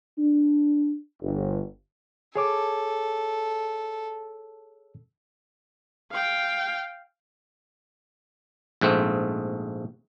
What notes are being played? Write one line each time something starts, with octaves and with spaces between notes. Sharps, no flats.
D4
G1
G#4 A4 C#5 D6
F5 G5
A#1 G#2 A3 C4